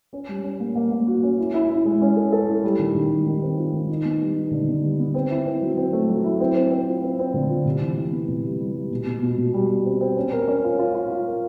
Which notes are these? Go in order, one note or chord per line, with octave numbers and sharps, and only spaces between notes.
C#4
G3
C#4
A#3
A#3
A#3
F#4
C#4
E4
E4
E4
G#3
C#4
A4
A4
E4
G3
D#3
D#3
G3
D#3
C4
F4
D#3
D#4
B3
G3
D#4
D3
B3
G3
B3
C4
E4
C4
F#3
C4
A3
F#3
E4
C4
C4
C4
F4
C4
C4
D3
F4
C3
E3
E3
B3
C3
G3
G3
G3
B2
B2
B2
B2
G3
G3
C4
C4
C#4
A#4
C#4
F4
F4
F4
F4
A#4